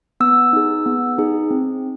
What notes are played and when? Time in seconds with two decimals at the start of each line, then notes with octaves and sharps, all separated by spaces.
0.20 B3 E6
0.53 D#4 G#4
0.86 B3
1.18 D#4 G#4
1.51 C4